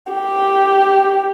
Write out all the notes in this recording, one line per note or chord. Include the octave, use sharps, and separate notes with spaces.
G4